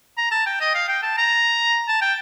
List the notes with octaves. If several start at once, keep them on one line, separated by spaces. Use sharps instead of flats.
A#5
A5
G5
D#5
F5
G5
A5
A#5
A5
G5